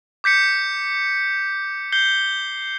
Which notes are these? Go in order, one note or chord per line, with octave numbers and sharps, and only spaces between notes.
D6 G6 B6 C#7
G6 C7 G7